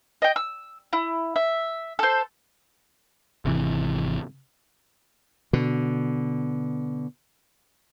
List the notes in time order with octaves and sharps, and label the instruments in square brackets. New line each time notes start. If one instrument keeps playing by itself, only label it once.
[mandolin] D#5 G5
E6
E4
E5
A4 C5
[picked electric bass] G#1 C3 E3
[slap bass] B2 D3